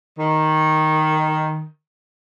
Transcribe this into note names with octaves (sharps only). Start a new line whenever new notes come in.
D#3